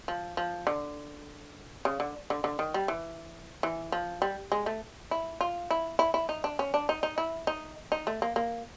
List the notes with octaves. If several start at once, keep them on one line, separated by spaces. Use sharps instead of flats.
F3
F3
D3
C#3
D3
D3
D3
D#3
G3
E3
E3
F3
G3
G#3
A3
E4
F4
E4
E4
E4
D#4
D4
C#4
D4
D#4
D#4
E4
D#4
D#4
A3
A#3
A#3